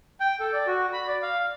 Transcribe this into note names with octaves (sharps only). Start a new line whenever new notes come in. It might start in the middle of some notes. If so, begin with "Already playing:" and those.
G5
A4
D5
F#4
B5
D5
F5